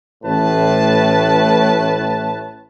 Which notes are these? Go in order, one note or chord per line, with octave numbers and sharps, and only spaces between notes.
A1 A2 B4 A5